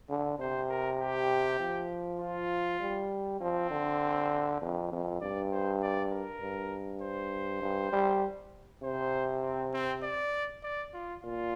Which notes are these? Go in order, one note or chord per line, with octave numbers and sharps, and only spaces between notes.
D3
C3 C5
A#4
G4
F3
F4
G3
F3 C4
D3
F2
F2
G2 D5
C5
D5
A#4
G2
C5
G2
G3
C3 C5
C4
C4
D5
D5
F4
A#2 F4